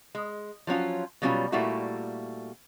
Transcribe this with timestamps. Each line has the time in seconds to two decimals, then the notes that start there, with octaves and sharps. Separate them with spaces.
0.15 G#3
0.67 F3 F#3 C#4 F4
1.22 B2 F#3 G3 C#4 F4 G#5
1.52 A#2 G3 A3 A#3 E4 F#4